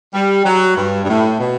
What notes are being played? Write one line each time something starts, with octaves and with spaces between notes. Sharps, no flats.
G3
F#3
G2
G2
A2
B2